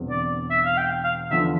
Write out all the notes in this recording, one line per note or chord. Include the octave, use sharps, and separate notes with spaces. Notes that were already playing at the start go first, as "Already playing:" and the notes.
Already playing: E1 E2 D3 G3 C4
D5
E5
F5
G5
F5
E2 D3 F3 E5